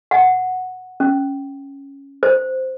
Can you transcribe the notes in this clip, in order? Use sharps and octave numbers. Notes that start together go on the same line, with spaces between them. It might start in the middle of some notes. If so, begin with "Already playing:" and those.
F#5
C#4
C5